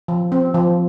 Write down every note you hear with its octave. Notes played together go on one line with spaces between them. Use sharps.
F3
C4
F3